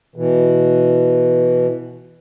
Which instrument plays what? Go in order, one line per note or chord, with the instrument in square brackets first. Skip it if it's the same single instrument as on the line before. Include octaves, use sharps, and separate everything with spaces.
[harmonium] B2 E3